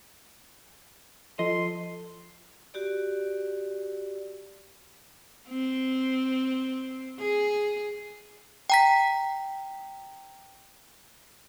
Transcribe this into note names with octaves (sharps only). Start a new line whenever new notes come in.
F3 A4 D#5 C6
F#4 G4 D5
C4
G#4
G5 A#5 B6